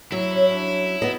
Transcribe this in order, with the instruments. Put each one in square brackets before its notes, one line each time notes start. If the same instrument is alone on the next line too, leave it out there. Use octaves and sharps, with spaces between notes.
[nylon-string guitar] F#3 [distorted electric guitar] E4
[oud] G3 C#4 C#5
C#4 D4 A4
[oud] D#3 [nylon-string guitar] B3 D#5